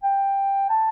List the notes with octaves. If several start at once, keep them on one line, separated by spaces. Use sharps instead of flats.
G5
A5